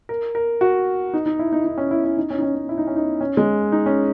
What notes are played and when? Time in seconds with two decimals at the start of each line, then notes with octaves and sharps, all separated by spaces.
0.09 A#4
0.35 A#4
0.61 F#4
1.14 D#4
1.26 D#4
1.39 E4
1.52 D#4
1.64 D#4
1.78 C#4
1.91 E4
2.05 E4
2.17 D#4
2.30 C#4
2.38 D#4
2.42 C#4
2.55 C#4
2.69 E4
2.78 D#4
2.87 C#4
2.96 D#4
3.21 C#4
3.37 G#3
3.72 D#4
3.86 C#4